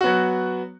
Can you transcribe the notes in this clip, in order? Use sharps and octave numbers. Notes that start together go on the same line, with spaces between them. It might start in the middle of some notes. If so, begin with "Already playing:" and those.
F#3 B3 F#4